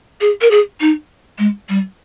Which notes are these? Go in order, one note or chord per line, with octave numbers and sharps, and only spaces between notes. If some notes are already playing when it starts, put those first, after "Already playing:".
G#4
A#4
G#4
D#4
G#3
G3